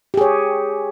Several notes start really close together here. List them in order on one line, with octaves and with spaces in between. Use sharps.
G4 G#4 C#5